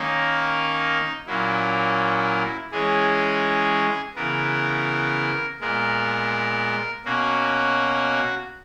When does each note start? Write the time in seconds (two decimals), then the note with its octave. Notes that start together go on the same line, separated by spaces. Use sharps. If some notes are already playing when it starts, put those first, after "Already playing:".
Already playing: D#3 A#3 C#4 D#4
1.26 A#2 F#3 A#3 C#4 E4
2.72 E3 G#3 C#4 G#4
4.15 C#3 E3 B3 A#4
5.60 A#2 G#3 B3 A#4
7.05 B2 A#3 C#4 F#4